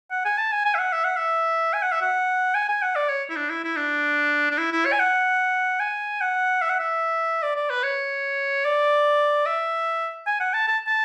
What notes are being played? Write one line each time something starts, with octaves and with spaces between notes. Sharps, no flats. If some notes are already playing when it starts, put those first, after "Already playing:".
F#5
G#5
A5
G#5
G#5
E5
F#5
E5
F#5
E5
G#5
F#5
E5
F#5
G#5
G#5
F#5
D5
C#5
E4
D4
E4
E4
D4
D4
E4
E4
C#5
G#5
F#5
G#5
F#5
E5
F#5
E5
D5
D5
B4
C#5
D5
E5
G#5
F#5
A5
A5
A5